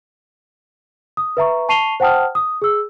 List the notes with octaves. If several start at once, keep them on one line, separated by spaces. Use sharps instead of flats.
D#6
B4 E5 A#5 C#6
A5 C#6 C7 D#7 F7 G7
C5 F#5 G5 A5 D#6 F6
D#6
G#4 E6